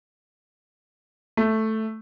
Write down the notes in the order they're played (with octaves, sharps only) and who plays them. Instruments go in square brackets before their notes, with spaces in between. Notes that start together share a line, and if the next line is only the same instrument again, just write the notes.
[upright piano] A3